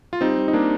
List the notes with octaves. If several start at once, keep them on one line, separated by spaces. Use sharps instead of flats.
F4
G3 C4 D#4
G3
D#4
G3 A#3 D4